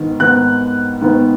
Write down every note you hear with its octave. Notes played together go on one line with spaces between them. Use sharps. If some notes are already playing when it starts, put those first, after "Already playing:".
Already playing: G#2 D#3 B3
G#2 D#3 B3 F#6
G#2 D#3 B3